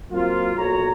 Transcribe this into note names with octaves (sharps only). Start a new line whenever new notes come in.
F#3 A#3 C4 F4
B1 A#2 F#3 C#5 A#5